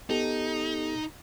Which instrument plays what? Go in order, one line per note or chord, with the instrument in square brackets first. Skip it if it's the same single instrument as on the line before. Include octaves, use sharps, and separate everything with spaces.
[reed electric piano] B3 G4 A4 [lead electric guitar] D#4